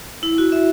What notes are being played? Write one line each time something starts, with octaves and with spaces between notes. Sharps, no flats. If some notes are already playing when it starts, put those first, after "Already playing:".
E4
F#4
E5